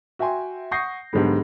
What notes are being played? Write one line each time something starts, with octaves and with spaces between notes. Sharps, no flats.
F#4 E5 G5 G#5 C6
F#5 C#6 D#6 G6 A#6 C7
B1 G#2 D3 G3 B3